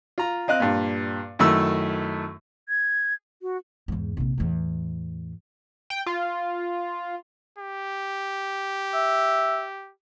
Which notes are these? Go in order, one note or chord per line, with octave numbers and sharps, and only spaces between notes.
F4 A#5
C4 D#5 F5 F#6
G2 A#2
F#2 D#3 A3 E4 E6
G#6
F#4
E2 G#2
A#1 C3
E2 A2
G5
F4
G4
E5